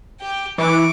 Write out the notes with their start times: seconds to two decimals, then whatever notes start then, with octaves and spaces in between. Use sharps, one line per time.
0.20 G4 G5
0.58 E3 C#6 D6